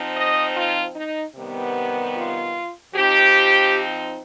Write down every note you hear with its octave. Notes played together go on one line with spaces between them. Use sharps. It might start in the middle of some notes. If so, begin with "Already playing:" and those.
Already playing: F3 C4 D#4
D#5
F4
D#4
C3 D#3 G3 B3
F4
F3 C4 D#4 G4